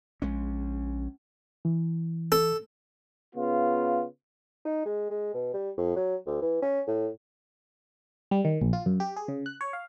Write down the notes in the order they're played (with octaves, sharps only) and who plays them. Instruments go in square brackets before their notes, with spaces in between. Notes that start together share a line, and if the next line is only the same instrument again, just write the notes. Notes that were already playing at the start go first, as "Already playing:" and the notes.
[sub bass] A#1 [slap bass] G#3 C#4
[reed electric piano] E3
[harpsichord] A4
[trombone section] C#3 B3 F4
[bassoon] D#4
G#3
G#3
B2
G3
F2
F#3
D2
E3
C#4
A2
[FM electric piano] G3
D#3
A#1
F4
F#2
G4
G#4
C#3
F#6
C#5
F5